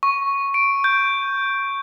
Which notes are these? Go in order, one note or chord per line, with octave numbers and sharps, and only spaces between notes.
C#6
D7
G6